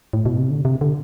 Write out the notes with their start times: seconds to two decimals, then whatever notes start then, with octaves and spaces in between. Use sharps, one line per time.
0.13 A2
0.26 B2
0.38 C3
0.50 D3
0.65 C3
0.81 D3